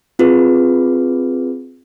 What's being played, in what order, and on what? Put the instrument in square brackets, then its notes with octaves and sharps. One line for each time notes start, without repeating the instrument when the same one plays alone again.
[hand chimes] C4 F4 G#4 B4